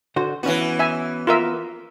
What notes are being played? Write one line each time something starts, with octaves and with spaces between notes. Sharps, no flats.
D3 F#4 C5
E3 B3 C#4 F#4
E5 G#5
F4 A#4 E5